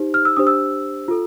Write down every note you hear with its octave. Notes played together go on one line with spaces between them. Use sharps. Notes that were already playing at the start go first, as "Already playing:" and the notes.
Already playing: D#4 G4 C5
F6
E6
D4 G4 C5 D#6
E6
F4 A4